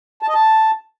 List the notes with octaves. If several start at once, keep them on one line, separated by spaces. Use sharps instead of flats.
A5
D#5
A5